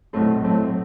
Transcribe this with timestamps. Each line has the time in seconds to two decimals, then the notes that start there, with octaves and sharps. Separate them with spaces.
0.13 B1 A2 F#3 A3 C4
0.42 B1 A2 F#3 A3 C4